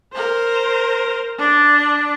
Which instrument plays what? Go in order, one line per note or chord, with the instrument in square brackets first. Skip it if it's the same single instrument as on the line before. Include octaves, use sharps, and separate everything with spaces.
[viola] A#4 C5
D4